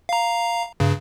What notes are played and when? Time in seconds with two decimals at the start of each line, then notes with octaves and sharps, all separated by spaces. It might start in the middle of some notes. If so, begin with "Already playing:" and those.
0.09 F5 A#5
0.80 G2 C#3